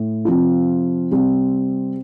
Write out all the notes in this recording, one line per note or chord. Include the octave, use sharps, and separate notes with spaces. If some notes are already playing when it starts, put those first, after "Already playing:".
Already playing: A2
C3 F3 C4 F4
C3 G3 C4